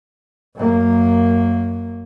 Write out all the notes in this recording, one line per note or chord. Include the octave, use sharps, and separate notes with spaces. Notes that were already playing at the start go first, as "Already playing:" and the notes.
F#2 A#3